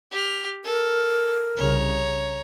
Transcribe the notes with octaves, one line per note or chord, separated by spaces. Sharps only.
G4 F6
A4 A#4
C2 C#3 C#5 A#5